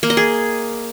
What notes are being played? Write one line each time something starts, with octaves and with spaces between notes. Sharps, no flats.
A#3
D#5
G#4